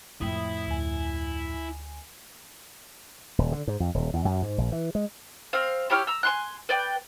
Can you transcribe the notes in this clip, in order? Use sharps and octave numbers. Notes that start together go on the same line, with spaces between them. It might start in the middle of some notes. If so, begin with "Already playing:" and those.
F2 A2 E4 G5 D#6
D2 G#5
D#1
D3
G#2
F2
D#1
E2
F#2
G#2
A#1
E3
G#3
C4 F5
E4 G4 C#5 F6
A#5 E6
G#5 C6 F#6
B4 D5 G5